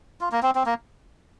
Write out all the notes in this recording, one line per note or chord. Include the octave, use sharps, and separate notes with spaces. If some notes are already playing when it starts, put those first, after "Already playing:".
F4
A#3
C4
C4
A#3